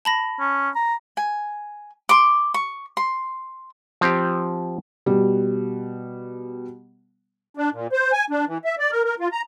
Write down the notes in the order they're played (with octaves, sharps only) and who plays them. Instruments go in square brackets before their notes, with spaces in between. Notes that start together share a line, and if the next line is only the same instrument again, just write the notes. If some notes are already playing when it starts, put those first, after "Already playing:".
[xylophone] A5 B5 A#6
[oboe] C#4
A#5
[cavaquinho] G#5
C6 D6
C#6
C6
[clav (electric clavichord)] F3 C4 G4
[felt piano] B2 G3
[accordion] D4
A#2
C5
G#5
D4
E3
E5
D5
A#4
A#4
F4
A#5